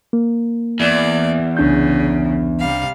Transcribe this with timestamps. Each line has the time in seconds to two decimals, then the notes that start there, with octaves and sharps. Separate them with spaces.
0.13 A#3
0.80 E2 D5
1.57 C2 C#3 D4 G6
2.59 C3 G3 F5